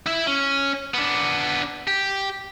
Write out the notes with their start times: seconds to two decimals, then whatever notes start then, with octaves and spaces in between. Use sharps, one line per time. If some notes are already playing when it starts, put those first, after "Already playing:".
0.06 E4 E5
0.27 C#4
0.94 B3 D4
1.87 G4